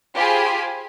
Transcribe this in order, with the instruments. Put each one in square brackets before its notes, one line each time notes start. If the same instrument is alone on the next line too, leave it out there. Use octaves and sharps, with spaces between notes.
[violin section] F4 G4 G#4 C5 G#5 B5